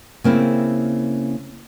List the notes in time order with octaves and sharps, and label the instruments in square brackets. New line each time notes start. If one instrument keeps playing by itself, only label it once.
[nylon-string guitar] C#3 A#3 C4 E4